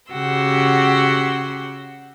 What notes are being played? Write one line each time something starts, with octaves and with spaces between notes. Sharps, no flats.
C#3 F#4 G4 F#5 C6 E6